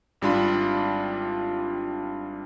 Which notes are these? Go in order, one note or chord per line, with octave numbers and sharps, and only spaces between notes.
G#1 G3 D4 F4 B5